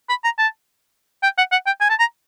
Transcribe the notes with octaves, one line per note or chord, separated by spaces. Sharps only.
B5
A#5
A5
G5
F#5
F#5
G5
G#5
A5
A#5